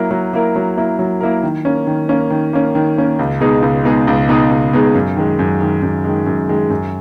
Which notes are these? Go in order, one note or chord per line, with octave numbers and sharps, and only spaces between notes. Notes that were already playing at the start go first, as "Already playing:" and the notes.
Already playing: F#3 A#3 E4 A#4
F#3
A#3 E4 A#4
F#3
A#3 E4 A#4
F#3
A#3 E4 A#4
D#3
A#3 C#4
D#3
A#3 C#4
D#3
A#3 C#4
D#3
A#3 C#4
C#2
B2 G#3 D#4 G#4
C#2
B2 G#3 D#4 G#4
C#2
B2 G#3 D#4 G#4
C#2
B2 G#3 D#4 G#4
F#2
D#3 G#3
F#2
D#3 G#3
F#2
D#3 G#3
F#2
D#3 G#3
F#2